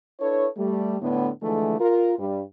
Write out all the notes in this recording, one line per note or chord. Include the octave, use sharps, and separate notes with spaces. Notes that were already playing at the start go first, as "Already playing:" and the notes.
D4 E4 A4 B4 C#5
G3 A3
A2 D3 B3
D3 E3 F3 G#3 A3
F4 A#4
G2 G3